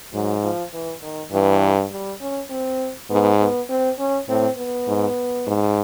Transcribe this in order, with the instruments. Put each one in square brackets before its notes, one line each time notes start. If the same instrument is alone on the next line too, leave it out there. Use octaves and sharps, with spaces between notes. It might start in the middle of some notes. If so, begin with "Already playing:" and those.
[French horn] G#2 [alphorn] F#3
[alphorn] F3
E3
D#3
[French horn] G2 [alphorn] E3
[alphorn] G3
C#4
C4
[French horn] G#2 [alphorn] B3
[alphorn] B3
C4
C#4
[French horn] A2 [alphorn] C4
[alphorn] B3
[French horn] G#2
G#2